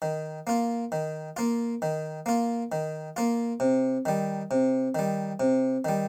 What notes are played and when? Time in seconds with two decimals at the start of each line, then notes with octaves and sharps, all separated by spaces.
0.02 D#3
0.47 A#3 F4
0.92 D#3
1.37 A#3 F4
1.82 D#3
2.26 A#3 F4
2.72 D#3
3.16 A#3 F4
3.60 C3
4.05 D#3 G3
4.51 C3
4.95 D#3 G3
5.40 C3
5.85 D#3 G3